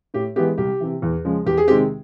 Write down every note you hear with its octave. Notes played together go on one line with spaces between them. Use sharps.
A2 G4
E3 G#3 B3 G4
C2 G4
C3 E3
E2
C#3 F3 G#3
E2 G4
G#4
C3 D#3 G#3 C4 G4